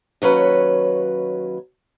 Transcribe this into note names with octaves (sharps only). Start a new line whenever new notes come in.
D#2 F#3 C#4 B4